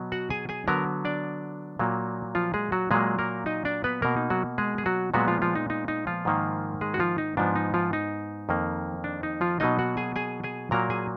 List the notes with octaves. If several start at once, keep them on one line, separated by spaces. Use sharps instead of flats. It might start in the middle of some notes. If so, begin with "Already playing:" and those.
Already playing: B2 F#3 B3
F#4 F#5
G#4 G#5
G#4 G#5
D3 F#3 B3 A#4 A#5
D4 D5
A#2 F#3 A#3
F3 F4
G#3 G#4
F#3 F#4
A#2 F#3 G#3 A#3 G#4
A#3 A#4
D#4 D#5
D4 D5
B3 B4
B2 A#3 A#4
D#4
F#3 F#4
G#3 G#4
G#4
F#3 F#4
A#2 F#3 G#3 B3 F#4
F3 F4
F3 F4
D#4
D#4
D#4
F3 F4
G#2 D#3 A#3
G#3 G#4
F#4
F3 F4
D#4
G#2 F3 B3 D4
D#4
F3 F4
D#4
F2 D#3 A#3
D4
D#4
F3 F4
B2 F#3 A#3 D#4 D#5
F#4 F#5
G#4 G#5
G#4 G#5
G#4 G#5
A#2 F#3 A#3 A#4 A#5
G#4 G#5